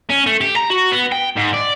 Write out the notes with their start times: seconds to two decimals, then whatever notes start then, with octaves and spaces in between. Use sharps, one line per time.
0.10 C#4
0.26 A3
0.41 G4
0.56 A#5
0.70 F#4
0.92 B3
1.12 G5
1.36 G#2
1.53 D5